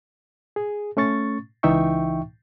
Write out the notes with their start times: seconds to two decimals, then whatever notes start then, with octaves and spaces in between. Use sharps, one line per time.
0.56 G#4
0.97 A3 C#4 C#6 A6
1.63 C#2 E3 D#4 E5 G5 C#6